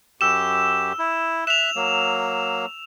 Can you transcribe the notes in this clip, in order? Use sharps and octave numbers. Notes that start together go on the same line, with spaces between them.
F#2 G4 E6 E7
E4
E5 F#6 E7 F7
F#3 A#3